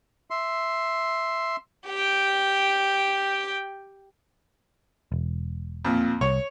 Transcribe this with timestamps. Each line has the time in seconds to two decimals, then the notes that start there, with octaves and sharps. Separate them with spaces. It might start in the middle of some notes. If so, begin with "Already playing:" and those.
0.30 E5 C6
1.87 G4 G5
5.12 E1
5.85 F2 A#2
6.21 C2 C#5